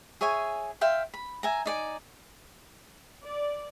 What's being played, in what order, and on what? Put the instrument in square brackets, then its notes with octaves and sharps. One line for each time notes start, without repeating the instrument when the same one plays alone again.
[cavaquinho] G#4 C#5 E5 G#5
E5 F5 G5 C6
B5
E5 G#5 A#5
D#4 D5 G#5
[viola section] D5